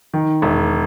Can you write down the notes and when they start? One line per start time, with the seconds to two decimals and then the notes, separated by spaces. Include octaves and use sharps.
0.13 D#3
0.42 E1